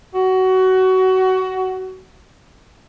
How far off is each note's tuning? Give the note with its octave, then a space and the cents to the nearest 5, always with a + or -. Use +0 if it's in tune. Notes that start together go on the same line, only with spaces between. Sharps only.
F#4 +20